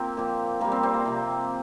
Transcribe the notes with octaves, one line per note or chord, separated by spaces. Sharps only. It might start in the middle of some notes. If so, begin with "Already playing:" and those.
Already playing: A#3 C4 F4 G4 A#4
A#2 F3
A#2 G3 A#3
C4
C4
A#3
C3 F3